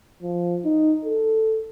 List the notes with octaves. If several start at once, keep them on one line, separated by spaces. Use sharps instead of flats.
F3
D#4
A4